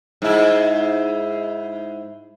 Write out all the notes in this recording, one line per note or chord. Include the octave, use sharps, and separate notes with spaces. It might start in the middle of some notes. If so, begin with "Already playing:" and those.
G#2 E4